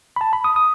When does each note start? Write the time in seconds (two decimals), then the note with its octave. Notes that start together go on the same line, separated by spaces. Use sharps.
0.16 B5
0.21 A5
0.33 B5
0.44 D#6
0.56 D#6